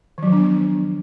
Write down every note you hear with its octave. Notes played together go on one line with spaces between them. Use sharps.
D#3 F3 F#3 B3 D4